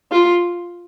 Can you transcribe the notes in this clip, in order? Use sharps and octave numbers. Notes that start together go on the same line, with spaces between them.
F4